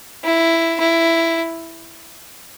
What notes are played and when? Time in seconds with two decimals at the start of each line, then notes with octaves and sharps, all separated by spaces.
0.24 E4
0.80 E4